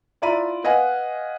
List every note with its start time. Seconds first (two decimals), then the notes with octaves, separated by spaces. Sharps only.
0.22 E4 F4 D5 A#5 B5 D#7
0.64 B4 D#5 F5 F#5 G#5